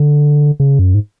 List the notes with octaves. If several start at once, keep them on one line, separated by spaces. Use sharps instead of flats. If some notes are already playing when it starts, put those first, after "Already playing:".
Already playing: D3
C#3
F#2
G#2